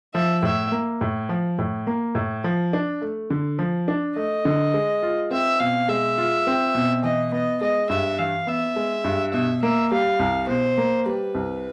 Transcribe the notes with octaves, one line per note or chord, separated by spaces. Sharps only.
F3 E5
A2 E5
A#3
A2
F3
A2
A#3
A2
F3
D4
A3
D3
F3
D4
A3 D#5
D3
G#3
F4
C4 E5
B2 F5
G#3 E5
F4
C4
B2
E3 D#5
B3 D#5
G#3 D#5
G2 E5
E3 F5
B3 E5
G#3
G2
B2 E5
A#3 E5
G3 F5
C2
B2 C5
A#3
G3 B4
C2